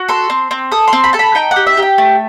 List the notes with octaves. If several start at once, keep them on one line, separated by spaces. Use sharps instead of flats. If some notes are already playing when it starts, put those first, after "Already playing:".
Already playing: F#4
A4 C6
C4
C4
A4 D#6
C6
C4
B5
A4 A5
B5
D#4 G5
F#5
G4
E5
G4
G5
A3